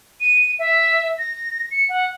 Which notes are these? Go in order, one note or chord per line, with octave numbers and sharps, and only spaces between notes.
D#7
E5
A#6
C#7
F#5